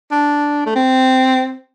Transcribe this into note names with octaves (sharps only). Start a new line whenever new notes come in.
D4
A3
C4